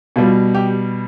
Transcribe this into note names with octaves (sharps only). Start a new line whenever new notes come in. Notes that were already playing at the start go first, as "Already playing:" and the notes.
B2 G3 F4
G4